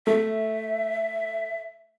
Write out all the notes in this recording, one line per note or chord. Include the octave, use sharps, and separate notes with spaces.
A3 E5